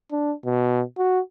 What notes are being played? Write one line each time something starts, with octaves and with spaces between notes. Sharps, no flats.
D4
B2
F#4